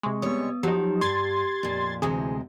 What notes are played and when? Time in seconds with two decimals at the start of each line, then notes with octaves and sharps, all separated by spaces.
0.03 C3 G#3 C#6
0.22 G3 B3 C#5 D#6
0.63 F3 F#3 D#4 G4
1.01 G2 C6 G#6 A6
1.63 F2 A#2
2.02 D2 C3 E3 G#3 G#4